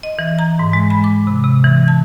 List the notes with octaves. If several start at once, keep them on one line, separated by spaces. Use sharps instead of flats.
D#5
E3
A#5
G#2
G#3
B5
D6
C3
C3
E3
A5